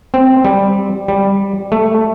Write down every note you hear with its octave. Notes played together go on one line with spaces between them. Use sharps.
C4
G3
G3
A3